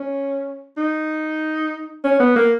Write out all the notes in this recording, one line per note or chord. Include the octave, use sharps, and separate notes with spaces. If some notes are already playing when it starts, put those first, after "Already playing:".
Already playing: C#4
D#4
C#4
B3
A#3